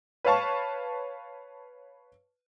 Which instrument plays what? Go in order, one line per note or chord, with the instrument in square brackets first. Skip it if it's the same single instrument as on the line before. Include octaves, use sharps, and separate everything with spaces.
[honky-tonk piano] B4 C#5 F5 A5 C#6